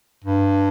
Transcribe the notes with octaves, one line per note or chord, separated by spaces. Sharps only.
G2